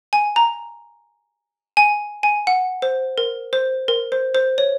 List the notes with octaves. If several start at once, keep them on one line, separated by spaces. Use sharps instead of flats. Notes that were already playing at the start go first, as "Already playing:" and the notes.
G#5
A#5
G#5
G#5
F#5
C5
A#4
C5
A#4
C5
C5
C#5